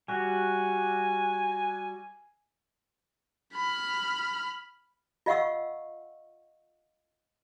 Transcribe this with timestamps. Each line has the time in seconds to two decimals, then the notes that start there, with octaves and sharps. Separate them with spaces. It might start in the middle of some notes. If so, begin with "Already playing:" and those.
0.08 G3 F#4 G#5
3.53 B5 F6
5.26 F4 D#5 F5 F#5 C#6 E6